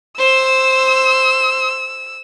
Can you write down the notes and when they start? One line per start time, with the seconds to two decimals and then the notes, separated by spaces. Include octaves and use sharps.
0.19 C5 E6